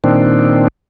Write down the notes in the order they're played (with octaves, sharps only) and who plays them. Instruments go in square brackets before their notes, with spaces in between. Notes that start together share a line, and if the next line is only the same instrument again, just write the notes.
[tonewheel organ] A#2 D#3 C4 D4